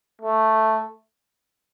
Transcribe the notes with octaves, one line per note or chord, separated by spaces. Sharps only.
A3